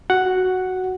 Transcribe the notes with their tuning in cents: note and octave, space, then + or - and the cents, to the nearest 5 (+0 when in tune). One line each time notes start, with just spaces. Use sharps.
F#4 +0 F#5 +0